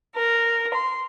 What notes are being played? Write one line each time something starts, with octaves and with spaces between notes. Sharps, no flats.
A#4
C6